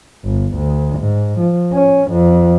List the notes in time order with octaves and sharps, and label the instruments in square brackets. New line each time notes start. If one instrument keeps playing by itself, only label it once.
[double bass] G1
D2
G#2
F3
C#4
F2